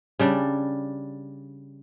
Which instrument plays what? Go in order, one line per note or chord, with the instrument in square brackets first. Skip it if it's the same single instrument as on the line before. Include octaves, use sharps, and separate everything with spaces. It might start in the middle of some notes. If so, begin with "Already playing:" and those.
[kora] C#3 G3 D4